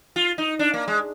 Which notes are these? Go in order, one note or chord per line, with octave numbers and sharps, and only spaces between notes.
F4
D#4
D4
A#3
G#3